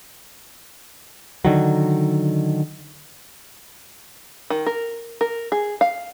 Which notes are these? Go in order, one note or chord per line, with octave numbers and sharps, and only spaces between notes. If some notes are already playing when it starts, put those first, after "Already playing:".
D3 D#3 F#3
D#3
A#4
A#4
G#4
F5